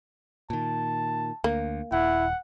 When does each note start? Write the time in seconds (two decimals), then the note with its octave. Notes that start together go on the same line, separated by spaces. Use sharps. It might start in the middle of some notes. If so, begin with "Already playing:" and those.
0.50 A#2 D#3 A5
1.44 D2 A#3
1.92 D#1 E4 F#5